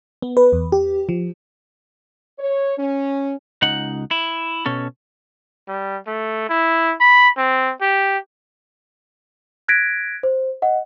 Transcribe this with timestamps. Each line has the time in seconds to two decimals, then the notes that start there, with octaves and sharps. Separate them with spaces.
0.22 B3
0.37 B4
0.53 E2
0.72 G4
1.09 F3
2.39 C#5
2.77 C#4
3.62 C#2 D#4 F#5
4.11 E4
4.66 B2 C#4 A4
5.68 G3
6.07 A3
6.49 E4
7.00 B5
7.37 C4
7.81 G4
9.68 F#6 G#6 A#6 B6 D7
10.23 C5
10.62 D#5 F#5